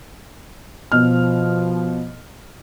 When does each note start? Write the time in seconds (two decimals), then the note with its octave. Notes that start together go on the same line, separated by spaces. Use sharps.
0.92 B2 F3 F6